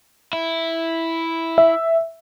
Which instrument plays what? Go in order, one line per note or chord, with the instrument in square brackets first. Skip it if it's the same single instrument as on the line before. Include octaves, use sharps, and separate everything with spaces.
[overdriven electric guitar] E4
[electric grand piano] E5